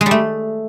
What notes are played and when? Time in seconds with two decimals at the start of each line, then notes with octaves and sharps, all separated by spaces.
0.01 G#3
0.06 G3
0.11 A3